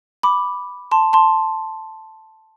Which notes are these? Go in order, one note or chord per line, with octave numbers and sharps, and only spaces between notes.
B5 D6
A5 C6
A5 C6